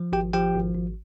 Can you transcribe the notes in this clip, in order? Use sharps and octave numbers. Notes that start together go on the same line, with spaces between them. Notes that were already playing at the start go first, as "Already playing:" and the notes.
Already playing: F3
G#1 G4 G5
F3 G4 G5
G#1
G#1